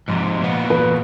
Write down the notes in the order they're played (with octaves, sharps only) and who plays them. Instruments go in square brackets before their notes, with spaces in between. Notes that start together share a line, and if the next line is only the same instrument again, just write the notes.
[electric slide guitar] G#2 C3 [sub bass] F3
[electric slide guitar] A#2 B3
[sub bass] E3 [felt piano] B4